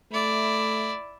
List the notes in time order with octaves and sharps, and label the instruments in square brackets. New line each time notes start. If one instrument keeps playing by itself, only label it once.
[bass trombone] A3 [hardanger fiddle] E4 D5